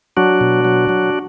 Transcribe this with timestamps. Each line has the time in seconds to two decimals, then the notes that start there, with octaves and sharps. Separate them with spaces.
0.17 F#3 D4 F#4
0.41 B2
0.65 F#3
0.89 F#3